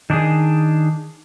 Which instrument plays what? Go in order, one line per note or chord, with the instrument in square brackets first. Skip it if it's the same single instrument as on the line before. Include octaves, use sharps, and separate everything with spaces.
[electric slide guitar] D#3 D4 D#4 G#4